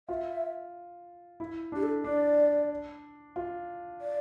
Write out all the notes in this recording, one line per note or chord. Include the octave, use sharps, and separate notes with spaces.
F4 E5
E4
D4 G4
A4
D4 D5
F4
D5